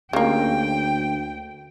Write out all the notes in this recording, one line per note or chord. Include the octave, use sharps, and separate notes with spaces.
D2 C#3 A#3 G5